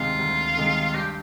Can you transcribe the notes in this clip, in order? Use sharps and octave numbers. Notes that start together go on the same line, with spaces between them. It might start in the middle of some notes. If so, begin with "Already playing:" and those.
Already playing: D2 C3 D#3 G#3 F4
D2
C3 D#3 G#3
G2 G4